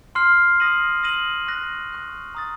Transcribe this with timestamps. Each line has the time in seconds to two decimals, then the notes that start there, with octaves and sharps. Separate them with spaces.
0.15 C6 F6 C7
0.60 D#6 A#6 D#7 F#7
1.03 D#6 A#6 D#7 F#7
1.47 C#6 F#6 A#6
1.91 C#6 F#6 A#6
2.35 A#5 D#6 A6